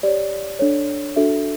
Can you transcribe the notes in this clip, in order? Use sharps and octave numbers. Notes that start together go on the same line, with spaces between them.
G4 C#5 D5
D4 A4 C#5
D4 F#4 A4 E5